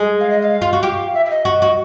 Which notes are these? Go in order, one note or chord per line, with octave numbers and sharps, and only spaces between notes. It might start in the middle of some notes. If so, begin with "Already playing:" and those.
Already playing: G#3
F5
D#5
F5
F4
F#4
G4
E5
E5
D#5
F#4
F#4